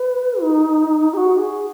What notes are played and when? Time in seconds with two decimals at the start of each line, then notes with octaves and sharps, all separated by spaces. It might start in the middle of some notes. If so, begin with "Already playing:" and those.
Already playing: B4
0.42 D#4
1.14 G#4
1.17 F#4
1.38 G#4